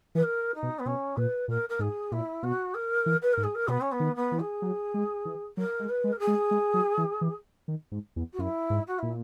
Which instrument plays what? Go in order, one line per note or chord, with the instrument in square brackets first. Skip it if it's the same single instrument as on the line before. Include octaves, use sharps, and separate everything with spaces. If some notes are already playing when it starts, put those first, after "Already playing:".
[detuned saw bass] E3 [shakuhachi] B4
[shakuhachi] A#4
D#4
[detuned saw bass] B2
[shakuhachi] B3
[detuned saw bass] B2 [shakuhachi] C#4
[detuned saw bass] A#2 [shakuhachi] B4
[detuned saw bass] A#2 [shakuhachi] A#4
[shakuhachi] A#4
[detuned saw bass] G#2 [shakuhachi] G#4
[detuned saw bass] A#2 [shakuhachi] E4
[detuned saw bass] B2 [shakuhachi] F#4
[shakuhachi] A#4
[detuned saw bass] E3
[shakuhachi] B4
A#4
[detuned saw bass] G#2
[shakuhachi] G#4
A#4
[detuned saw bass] B2 [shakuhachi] B3
[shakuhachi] C#4
B3
[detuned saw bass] D#3
[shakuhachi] B3
[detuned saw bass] E3
[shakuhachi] G#4
[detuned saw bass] F#3
G#3
E3
[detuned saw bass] F#3 [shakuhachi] A#4
[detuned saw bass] G#3
[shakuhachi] B4
[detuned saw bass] G#3
[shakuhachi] A#4
G#4
[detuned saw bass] G#3
G#3
F#3
E3
E3
D#3
G#2
E2
[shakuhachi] F#4
[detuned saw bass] F#2 [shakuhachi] E4
[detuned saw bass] G#2
[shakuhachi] F#4
[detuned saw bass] A#2 [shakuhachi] E4